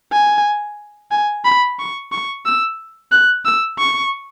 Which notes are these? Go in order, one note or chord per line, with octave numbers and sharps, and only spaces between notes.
G#5
G#5
B5
C#6
C#6
E6
F#6
E6
C#6